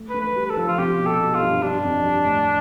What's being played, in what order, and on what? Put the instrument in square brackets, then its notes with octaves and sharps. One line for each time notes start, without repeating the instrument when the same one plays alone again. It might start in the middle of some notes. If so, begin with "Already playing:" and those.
Already playing: [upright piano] A3
[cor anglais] B4
[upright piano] A3
[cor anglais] B4
[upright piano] G3
[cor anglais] B4
A4
[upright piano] F3
[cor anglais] F4
[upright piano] C3 [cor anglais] G4
[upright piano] B2
[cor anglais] A4
[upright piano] B2
[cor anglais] F4
[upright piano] G2
[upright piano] G2 [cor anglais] D4
[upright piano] G2
F2
G2
A2